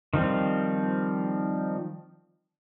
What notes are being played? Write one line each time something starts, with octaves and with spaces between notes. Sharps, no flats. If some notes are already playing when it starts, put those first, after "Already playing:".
D#3 F3 G3 C4